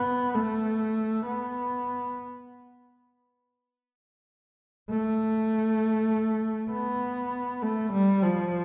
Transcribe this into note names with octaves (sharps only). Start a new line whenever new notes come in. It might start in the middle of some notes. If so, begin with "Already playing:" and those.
Already playing: B3
A3
B3
A3
B3
A3
G3
F3